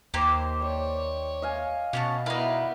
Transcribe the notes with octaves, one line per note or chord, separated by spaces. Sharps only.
D#2 A#3 G4 C5
C#5 D5
D#5 F5 G#5
B2 C#4 C#5 A5
B3 D#4 E4 A#4 D5 F5